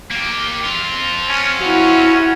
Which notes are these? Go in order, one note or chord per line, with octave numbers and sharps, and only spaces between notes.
A#3 G4
C4 F4
C#4
C#4 E4 F#4